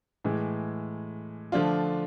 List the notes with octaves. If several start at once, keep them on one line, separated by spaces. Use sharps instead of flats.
A2 E3 G#3
D3 F3 A3 D4 F4